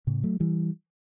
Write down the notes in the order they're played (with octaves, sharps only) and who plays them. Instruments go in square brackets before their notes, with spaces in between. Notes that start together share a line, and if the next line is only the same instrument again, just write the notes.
[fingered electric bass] A2 C#3
F#3 A3
E3 G3